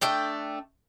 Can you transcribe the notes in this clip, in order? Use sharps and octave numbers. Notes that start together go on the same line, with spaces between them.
A3 D4 A4 G5